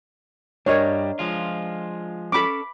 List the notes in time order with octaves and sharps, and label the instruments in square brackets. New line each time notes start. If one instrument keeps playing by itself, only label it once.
[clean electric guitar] G2 G3 [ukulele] D4 A#4 D#5 [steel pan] C#5
[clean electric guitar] F3 G#3 F4
[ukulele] C#4 A4 [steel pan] B5 D6